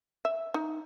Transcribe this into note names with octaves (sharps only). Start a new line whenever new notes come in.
E5
D#4